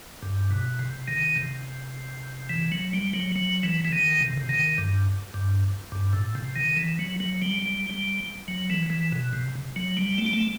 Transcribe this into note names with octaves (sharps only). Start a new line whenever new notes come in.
G2
B2
C3
D#3
C3
E3
F#3
G3
F#3
F#3
E3
E3
D#3
C3
C3
D#3
G2
G2
G2
A2
C3
D#3
E3
F#3
F#3
G3
G3
G3
F#3
E3
E3
B2
C3
F#3
G3
A3
G3
A3